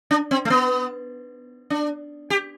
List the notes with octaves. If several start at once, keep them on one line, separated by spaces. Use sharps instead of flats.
D4
C4
A3
B3
D4
G4